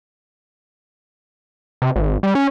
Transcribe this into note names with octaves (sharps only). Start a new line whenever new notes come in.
C3
G#1
G3
C#4